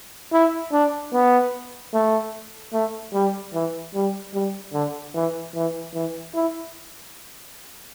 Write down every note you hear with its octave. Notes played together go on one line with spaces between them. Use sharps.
E4
D4
B3
A3
A3
G3
E3
G3
G3
D3
E3
E3
E3
E4